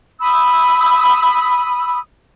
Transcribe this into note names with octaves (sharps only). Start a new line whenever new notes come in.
B5 D#6 E6